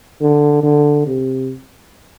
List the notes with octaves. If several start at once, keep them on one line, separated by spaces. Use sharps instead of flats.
D3
D3
C3